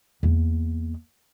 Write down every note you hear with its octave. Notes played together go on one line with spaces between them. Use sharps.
E2 A#3